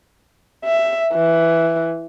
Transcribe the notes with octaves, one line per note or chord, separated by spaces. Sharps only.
E5
E3